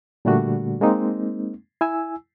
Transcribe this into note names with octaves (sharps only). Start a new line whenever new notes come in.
A#2 D3 G3 A3 D4 F#4
G#3 A#3 C4 D#4
E4 G#5 E6